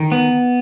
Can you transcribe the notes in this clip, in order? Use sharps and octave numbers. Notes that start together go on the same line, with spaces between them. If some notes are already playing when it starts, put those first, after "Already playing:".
Already playing: D#3
B3